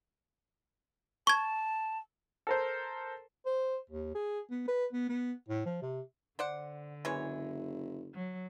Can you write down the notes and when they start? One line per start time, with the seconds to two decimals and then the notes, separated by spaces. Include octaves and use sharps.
1.27 A5 C#6 G#6
2.47 A4 A#4 C5
3.46 C5
3.90 D#2
4.15 G#4
4.51 B3
4.68 B4
4.93 B3
5.09 B3
5.49 A2
5.66 F3
5.82 C3
6.39 D3 C5 D5 F#5
7.05 F#1 E3 G#3 C#5
8.13 F#3